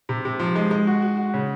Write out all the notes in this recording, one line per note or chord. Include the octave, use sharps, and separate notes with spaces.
C3
C3
F3
G#3
G#3
F#4
F#4
F#4
C#3